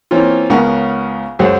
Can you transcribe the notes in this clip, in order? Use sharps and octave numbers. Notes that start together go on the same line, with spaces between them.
E3 A#3 C4 C#4 F4
C#2 C#3 B3 A#4 F#5 C#6
C#2 F#2 G#4 C5 C#5 F#5